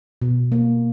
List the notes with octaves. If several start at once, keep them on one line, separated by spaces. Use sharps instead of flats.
B2
A#3